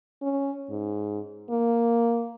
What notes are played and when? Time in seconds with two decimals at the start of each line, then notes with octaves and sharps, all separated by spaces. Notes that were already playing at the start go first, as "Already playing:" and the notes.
0.22 C#4
0.70 G#2
1.50 A#3